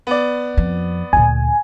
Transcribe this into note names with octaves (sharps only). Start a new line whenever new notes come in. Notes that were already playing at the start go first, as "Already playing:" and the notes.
B3 D5
F2 F3
D2 A#2 G#5